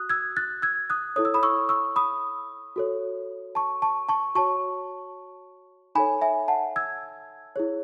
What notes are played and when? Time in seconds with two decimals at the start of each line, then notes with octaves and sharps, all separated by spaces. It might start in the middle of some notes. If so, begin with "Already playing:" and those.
Already playing: F#4 D#6 F#6
0.09 E6 G#6
0.37 F#6 A6
0.62 E6 G#6
0.90 D#6 F#6
1.16 E4 A4 C#5 D#6
1.25 E6
1.34 B5 D#6
1.43 C#6 E6
1.69 C#6 E6
1.96 B5 D#6
2.76 F#4 A4 C#5
3.55 A5 C#6
3.82 A5 C#6
4.09 A5 C#6
4.35 F#4 C#5 A5 C#6
5.95 D#4 A4 C#5 G#5 B5
6.22 E5 G#5
6.48 F#5 A5
6.76 E6 G#6
7.56 E4 G#4 C#5